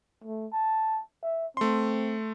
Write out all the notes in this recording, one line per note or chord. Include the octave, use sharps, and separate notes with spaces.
A3
A5
E5
A3 C4 C6